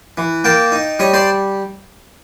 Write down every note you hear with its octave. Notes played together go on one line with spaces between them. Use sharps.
E3
A#3 G5 A5
D#4
G3 C#5 D#5
C5 D5